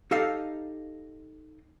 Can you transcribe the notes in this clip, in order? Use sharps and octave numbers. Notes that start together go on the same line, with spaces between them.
D#4 G4 A4 D#5 F5